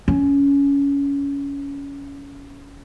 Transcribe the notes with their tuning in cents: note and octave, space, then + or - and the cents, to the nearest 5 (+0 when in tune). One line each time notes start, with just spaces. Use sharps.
C#4 +20